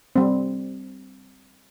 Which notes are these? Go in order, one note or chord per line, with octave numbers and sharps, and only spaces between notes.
G3 C4